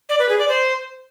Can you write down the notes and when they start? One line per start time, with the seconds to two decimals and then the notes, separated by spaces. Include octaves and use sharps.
0.09 D5
0.19 B4
0.29 G#4
0.39 D5
0.49 C5